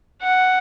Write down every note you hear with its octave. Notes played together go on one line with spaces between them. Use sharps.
F#5